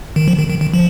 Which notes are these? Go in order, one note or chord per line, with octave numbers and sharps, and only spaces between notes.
D#3
F3
D#3
D#3
D#3
F3